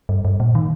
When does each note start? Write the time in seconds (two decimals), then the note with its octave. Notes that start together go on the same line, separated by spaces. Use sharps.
0.09 G2
0.25 G2
0.40 A#2
0.55 D#3